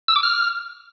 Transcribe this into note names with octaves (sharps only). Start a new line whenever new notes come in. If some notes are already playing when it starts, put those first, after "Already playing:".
E6
D6
F6